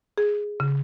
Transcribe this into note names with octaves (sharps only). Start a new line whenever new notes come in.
G#4
C#3